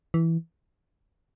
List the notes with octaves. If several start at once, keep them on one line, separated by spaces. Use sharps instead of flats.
E3